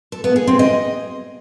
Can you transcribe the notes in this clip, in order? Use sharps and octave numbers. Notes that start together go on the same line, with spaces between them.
A4
B3
G#4
C4
D#5